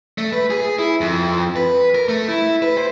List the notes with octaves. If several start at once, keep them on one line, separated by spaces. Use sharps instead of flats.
A3
B4
G#4
E4
F2
B4
A#4
A3
E4
B4
C5